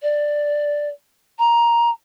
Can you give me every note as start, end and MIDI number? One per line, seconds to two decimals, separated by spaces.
0.03 0.88 74
1.39 1.90 82